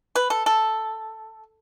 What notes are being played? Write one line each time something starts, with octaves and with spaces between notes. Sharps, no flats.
B4
A4
A4